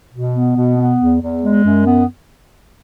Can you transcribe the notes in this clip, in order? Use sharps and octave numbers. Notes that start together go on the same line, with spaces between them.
B2
B3
B2
B3
E2
E2
G#3
F#2
B3